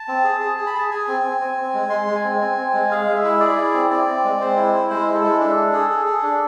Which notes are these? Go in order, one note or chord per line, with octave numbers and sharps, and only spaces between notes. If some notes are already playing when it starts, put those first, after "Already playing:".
Already playing: A5
C4
G#4
G#4
G#4
B5
G#4 A5
G#4 G#5
C4
C4
C4
C4
G#3
G#3 C6
G#3
G#5
C4
C4
C4
G#3
G#4 F5
G#3
E5
E4
G#4 D5
E4
C4
C4 D5
C4
G#3
C4 C5
E4
E4
G#3 C5
E4
A4
G#3
D4 A4
D4
G#4
G#4
G#4
D4